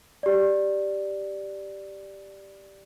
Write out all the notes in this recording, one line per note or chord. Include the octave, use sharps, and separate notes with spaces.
G4 D5